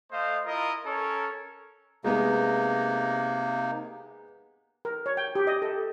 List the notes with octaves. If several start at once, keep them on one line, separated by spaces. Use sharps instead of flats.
A3 C5 D#5 F5
E4 F4 A#4 D#5
C#4 A4 A#4 C#5
C3 G#3 A#3 B3 D#4
A#4
C#5
G5
G4
D#5
A4